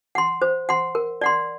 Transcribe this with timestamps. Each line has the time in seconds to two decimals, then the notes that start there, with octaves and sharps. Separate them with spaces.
0.15 F#5 C6
0.42 C5
0.69 F#5 C6
0.95 A#4
1.21 D5 F#5 C6